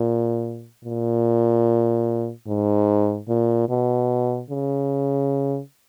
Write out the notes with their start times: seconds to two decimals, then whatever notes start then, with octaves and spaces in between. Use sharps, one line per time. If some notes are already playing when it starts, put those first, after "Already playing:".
Already playing: A#2
0.85 A#2
2.47 G#2
3.28 A#2
3.69 B2
4.50 C#3